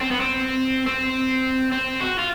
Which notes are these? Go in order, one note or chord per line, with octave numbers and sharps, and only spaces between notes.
C4
B3
C4
C4
C4
F#4
F4